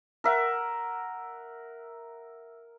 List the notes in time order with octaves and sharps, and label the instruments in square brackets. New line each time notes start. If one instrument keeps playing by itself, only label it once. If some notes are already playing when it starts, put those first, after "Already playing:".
[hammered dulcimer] A#4 E5 F#5